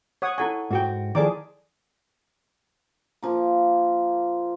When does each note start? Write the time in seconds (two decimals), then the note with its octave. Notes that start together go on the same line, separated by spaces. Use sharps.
0.22 C#5 F#5 D#6
0.38 E4 A4 F#5 G#5 C#6
0.71 G#2 F#4 G5
1.15 D#3 F3 E4 G#4 A4 D5 G#5 D6
3.23 F3 A#3